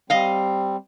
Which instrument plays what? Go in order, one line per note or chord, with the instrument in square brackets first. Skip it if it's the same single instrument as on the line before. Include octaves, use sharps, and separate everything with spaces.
[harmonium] G3 C4 [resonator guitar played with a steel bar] D#5 F5